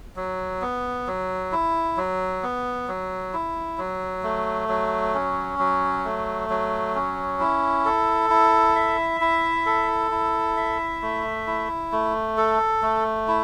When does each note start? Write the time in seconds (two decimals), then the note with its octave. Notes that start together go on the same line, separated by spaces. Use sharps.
0.16 F#3
0.62 B3
1.07 F#3
1.52 E4
1.97 F#3
2.43 B3
2.88 F#3
3.33 E4
3.78 F#3
4.23 A3
4.69 F#3
5.14 C#4
5.59 F#3
6.04 A3
6.50 F#3
6.95 C#4
7.40 E4
7.85 A4
8.30 E4
8.75 E5
9.21 E4
9.66 A4
10.11 E4
10.57 E5
11.02 A3
11.47 E4
11.92 A3
12.37 A4
12.83 A3
13.28 E4